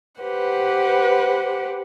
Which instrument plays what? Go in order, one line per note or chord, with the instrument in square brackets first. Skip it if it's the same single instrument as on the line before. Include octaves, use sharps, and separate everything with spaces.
[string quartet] G4 B4 C5 F#5